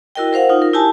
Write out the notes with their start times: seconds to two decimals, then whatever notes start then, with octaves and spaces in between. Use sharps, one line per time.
0.15 E4 F#4 A#4 D#5 G5
0.33 A#4 C5 F5 F#5
0.49 D#4 F4
0.62 A#4
0.74 E4 G4 G#5 A5